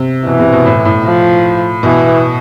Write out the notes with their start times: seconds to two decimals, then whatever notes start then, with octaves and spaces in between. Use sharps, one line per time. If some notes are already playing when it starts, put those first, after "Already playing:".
Already playing: C3
0.26 B2 E3
0.39 C3
0.53 B2
0.66 A2
0.85 A2
1.05 F3
1.83 B2 E3